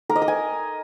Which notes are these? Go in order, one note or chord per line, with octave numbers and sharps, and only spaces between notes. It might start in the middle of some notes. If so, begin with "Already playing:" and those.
A#4
D#5
A#4
G#5